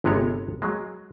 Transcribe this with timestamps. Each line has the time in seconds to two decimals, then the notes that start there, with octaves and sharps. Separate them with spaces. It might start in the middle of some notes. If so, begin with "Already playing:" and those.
0.04 G1 C3 G#3 B3 C#5
0.62 F#3 G#3